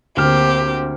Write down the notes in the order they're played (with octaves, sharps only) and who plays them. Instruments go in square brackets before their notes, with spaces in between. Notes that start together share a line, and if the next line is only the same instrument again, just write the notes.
[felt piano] D2 F6 [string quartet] A#3 C4 G4